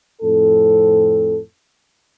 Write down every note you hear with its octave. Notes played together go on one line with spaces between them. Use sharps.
F2 A2 C4 A4